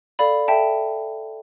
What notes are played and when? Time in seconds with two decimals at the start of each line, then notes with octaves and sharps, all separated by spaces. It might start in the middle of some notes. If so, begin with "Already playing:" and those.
0.19 A4 D5 F5 B5
0.48 A4 E5 G5 A5